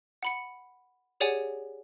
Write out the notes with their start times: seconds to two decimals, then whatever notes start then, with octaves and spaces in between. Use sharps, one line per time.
0.23 F#5 B5 C#7
1.20 G4 G#4 C#5 D5 F#5 G#5